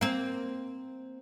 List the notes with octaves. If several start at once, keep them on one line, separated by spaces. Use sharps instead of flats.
A#3 C4